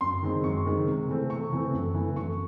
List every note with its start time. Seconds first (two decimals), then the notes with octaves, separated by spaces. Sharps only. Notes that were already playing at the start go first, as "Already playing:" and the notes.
0.01 F#2 C6
0.23 D#3 G#3 C4
0.44 F#2 C#6
0.66 D#3 G#3 C4
0.87 C3
1.08 E3 A3 C4
1.30 C3 C#6
1.52 E3 A3 C4
1.73 F#2
1.94 E3 A3
2.16 F#2 C#6